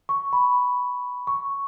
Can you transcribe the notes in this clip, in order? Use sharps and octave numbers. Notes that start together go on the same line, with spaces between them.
C#6
B5
C#6